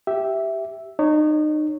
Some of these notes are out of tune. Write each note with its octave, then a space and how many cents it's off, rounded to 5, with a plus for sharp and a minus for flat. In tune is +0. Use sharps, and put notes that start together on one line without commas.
G4 -10 E5 +0
D#4 -30 C#5 +0